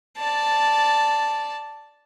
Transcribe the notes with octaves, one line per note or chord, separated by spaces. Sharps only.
D5 A5